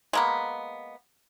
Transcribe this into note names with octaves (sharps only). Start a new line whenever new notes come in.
G#3 A#3 B3